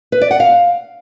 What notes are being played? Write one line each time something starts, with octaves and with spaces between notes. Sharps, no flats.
B4
D5
F#5
F5